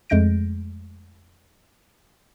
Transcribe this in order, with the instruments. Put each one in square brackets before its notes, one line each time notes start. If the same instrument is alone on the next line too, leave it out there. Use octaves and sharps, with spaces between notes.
[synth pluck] F2 G#3 A3 G6 A#6 D7